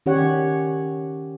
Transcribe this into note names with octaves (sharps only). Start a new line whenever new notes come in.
D#3 C#4 G4 C#5 F#5